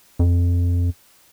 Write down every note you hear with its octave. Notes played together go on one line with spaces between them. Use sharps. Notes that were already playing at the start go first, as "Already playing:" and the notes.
F2